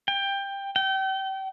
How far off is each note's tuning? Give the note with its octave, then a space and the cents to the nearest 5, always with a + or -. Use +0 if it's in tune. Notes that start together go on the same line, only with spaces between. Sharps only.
G5 +15
G5 -30